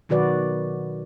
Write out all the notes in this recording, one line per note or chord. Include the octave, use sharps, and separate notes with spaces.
B2 D#3 F#3 F#4 B4 D5